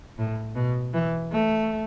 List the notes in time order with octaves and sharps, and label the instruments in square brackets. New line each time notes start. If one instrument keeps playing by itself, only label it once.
[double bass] A2
B2
E3
A3